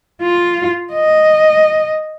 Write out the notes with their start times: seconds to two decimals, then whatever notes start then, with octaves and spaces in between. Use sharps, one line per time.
0.22 F4
0.92 D#5